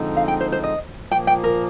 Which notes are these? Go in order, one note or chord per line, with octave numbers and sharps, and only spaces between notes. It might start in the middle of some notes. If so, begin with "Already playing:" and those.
Already playing: D3 F3 G#3 C4 D#4
F5
G5
C5
C5
D#5
A#2 F3 A#3 G5
G5
A#4